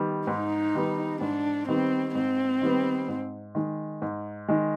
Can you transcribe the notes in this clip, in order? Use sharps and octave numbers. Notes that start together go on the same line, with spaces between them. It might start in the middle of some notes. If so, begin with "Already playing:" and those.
Already playing: D#3 G3 B3
G#2 D#4
D#3 G3 B3
G#2 D4
D#3 G3 B3 C4
G#2 C4
D#3 G3 B3
G#2
D#3 G#3
G#2
D#3 G#3